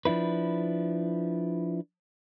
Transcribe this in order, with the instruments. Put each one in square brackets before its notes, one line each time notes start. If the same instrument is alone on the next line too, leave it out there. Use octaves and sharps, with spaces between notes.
[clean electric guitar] F3 D4 E4 B4